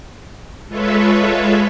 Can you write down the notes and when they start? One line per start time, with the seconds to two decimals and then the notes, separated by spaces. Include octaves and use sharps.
0.67 G#3 F4 A4 B4 C#5 E5